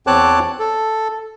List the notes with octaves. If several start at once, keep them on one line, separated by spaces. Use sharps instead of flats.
E2 C4 C#5 A5 D6 F#6
A4